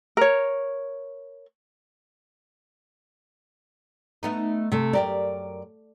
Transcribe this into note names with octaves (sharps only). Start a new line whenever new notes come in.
A#4 C#5
A3 B3 D#4
C3 A3
F#2 G4 A#4 D5